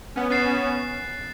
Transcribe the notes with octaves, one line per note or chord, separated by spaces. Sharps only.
B3 C#4
B3 C#4 F#6 A6 C7 E7